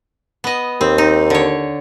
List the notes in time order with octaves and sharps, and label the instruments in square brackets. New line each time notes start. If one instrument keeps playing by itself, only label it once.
[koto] B3 D#5
[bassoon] D#2 [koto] C4
[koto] D#4
D3 C#5